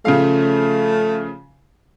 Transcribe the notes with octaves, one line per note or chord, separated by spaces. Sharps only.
C#3 F3 A3 F5